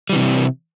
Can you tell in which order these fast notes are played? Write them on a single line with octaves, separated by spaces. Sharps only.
G3 E3 C3